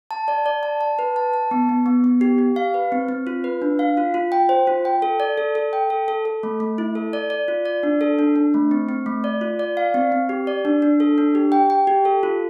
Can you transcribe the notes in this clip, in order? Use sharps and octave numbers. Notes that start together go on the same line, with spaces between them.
A5
D5
D5
A5
A5
B4
A5
A5
B3
B3
B3
B3
G4
G4
F5
B4
C4
C4
F4
B4
D4
F5
F4
F4
G5
C5
F4
G5
A4
D5
A4
A4
G5
A4
A4
A4
A3
A3
E4
A4
D5
D5
F4
D5
D4
A4
D4
D4
A3
C4
C4
A3
D5
F4
D5
F5
C4
C4
G4
D5
D4
D4
A4
D4
G4
G5
G5
G4
A4
F4